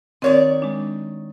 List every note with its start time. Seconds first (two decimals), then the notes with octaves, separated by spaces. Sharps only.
0.22 D#3 C4 A#4 C#5 D5
0.62 G#3 D4